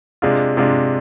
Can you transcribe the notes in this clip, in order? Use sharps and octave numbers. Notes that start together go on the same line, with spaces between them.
C3 G#3 D4 F4
C3 G#3 D4 F4